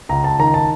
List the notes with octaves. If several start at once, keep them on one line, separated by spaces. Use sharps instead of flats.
C#2 A#5
A5
D#3 A#5
A5